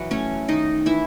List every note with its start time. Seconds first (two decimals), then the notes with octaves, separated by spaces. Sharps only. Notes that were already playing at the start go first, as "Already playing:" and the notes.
Already playing: E3 F#3 F#4
0.11 A3 C#4 C#5
0.48 D#3 D#4 D#5
0.86 E3 E4 E5